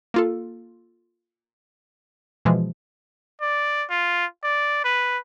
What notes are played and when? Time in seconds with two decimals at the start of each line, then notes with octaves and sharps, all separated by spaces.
0.14 A#3 F4 A4
2.45 B2 E3 F3 G#3
3.41 D5
3.90 F4
4.44 D5
4.84 B4